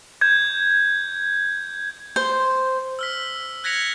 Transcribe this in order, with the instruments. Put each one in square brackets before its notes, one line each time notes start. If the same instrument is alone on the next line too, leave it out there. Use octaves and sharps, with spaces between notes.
[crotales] G6 G#6
[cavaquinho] C5
[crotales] E6 F6 B6
F#6 G#6 A#6 B6 C#7 F7